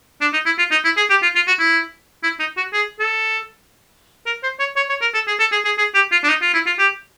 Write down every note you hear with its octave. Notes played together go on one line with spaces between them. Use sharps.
D4
D#4
E4
F4
D#4
E4
G#4
G4
F4
F4
F#4
E4
E4
D#4
F#4
G#4
A4
A#4
C5
C#5
C#5
C#5
A#4
A4
G#4
A4
G#4
G#4
G#4
G4
F4
D4
D#4
F4
E4
F4
G4